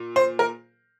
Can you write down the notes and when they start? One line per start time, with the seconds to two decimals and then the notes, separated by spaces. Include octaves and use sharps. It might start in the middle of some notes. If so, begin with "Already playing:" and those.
Already playing: A#2
0.16 C5
0.39 A#4